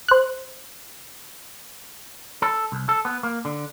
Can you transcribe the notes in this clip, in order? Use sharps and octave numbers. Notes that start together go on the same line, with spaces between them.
C5 F#6
A4
C2
A4
B3
A#3
D3